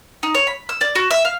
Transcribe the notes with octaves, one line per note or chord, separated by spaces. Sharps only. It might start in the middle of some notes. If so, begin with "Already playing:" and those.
D#4
C#5
B5
E6
D5
F#4
E5
F5